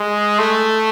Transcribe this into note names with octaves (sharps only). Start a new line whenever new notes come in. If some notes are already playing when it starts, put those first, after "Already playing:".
Already playing: G#3
A3